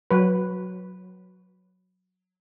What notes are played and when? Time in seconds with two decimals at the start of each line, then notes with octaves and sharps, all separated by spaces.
0.11 F#3 B4